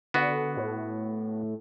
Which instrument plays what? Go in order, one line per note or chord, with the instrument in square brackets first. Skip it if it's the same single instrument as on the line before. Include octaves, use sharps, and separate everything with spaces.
[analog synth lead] D3 [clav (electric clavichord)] B3 F#4
[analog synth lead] A2